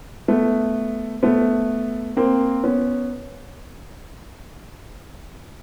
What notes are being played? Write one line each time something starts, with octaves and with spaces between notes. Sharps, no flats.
A3 B3
A3 B3
A#3 C4
B3 C#4